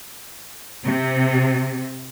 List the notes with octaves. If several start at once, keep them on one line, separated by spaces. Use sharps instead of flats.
C3